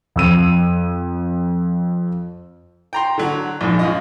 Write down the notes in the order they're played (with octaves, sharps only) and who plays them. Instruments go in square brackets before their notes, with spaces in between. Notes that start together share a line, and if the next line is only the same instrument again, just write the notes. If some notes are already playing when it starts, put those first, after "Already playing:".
[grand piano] F2 E6 D#7
[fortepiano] G5 A#5 C6
D3 F#3
A#1 G#2
F#2 F4 D#5